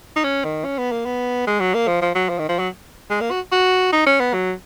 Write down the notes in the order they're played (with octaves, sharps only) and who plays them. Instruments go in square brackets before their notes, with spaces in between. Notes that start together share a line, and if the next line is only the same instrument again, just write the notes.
[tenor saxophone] D#4
C#4
D#3
C#4
B3
A#3
B3
G#3
F#3
A#3
F3
F3
F#3
F3
D#3
F3
F#3
G#3
A#3
F#4
F#4
D#4
C#4
B3
F#3